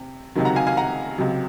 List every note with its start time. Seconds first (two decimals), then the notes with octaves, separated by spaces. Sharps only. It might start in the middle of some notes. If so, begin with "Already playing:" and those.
Already playing: C3
0.35 C#2 C3 D#3 F#3
0.45 F#5 A#5
0.56 F5 G#5
0.67 F5 G#5
0.77 F#5 A#5
1.18 C#2 C3 F#3